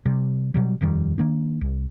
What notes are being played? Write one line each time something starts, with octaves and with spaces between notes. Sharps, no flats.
C3 G3
B2 F#3 G3
D#1 F2 D#3 G3
D#3 A#3 D4
C2